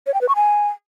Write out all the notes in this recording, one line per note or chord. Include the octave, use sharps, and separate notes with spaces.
C#5
G5
B4
C#6
G#5